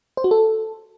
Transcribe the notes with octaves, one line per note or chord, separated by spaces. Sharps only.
C5
F#4
A4